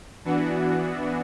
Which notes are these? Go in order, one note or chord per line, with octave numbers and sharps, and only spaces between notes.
E3 B3 D4 F#4